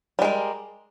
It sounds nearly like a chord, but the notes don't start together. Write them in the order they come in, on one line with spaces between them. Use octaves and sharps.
G3 G#3 A#4